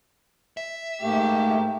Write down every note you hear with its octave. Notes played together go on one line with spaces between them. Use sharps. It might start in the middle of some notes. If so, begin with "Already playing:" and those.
E5
G#2 A3 A#3 G4